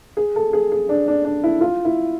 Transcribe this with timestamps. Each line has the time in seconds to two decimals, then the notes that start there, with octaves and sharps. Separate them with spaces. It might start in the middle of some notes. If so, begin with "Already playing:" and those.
0.17 G#4
0.36 A4
0.53 G#4
0.72 G#4
0.89 D4
1.08 D4
1.24 D4
1.44 E4
1.61 F4
1.85 E4